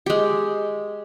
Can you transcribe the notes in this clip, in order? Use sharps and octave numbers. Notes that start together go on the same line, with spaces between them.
G#3 G4